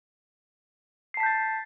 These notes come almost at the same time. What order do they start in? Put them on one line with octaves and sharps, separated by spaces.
C7 A5 B6 G6 A6